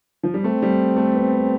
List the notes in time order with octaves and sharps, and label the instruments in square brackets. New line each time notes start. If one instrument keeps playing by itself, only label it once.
[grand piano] F3
G3
[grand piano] A3 [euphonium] C4
[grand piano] G3
A3
B3